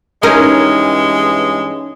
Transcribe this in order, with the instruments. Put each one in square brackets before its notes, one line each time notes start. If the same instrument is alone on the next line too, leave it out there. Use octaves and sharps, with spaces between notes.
[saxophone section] G2 E3 G#3 [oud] C#4 D#4 A#4